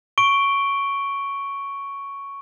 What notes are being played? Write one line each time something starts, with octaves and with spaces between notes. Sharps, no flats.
C#6 D7 G7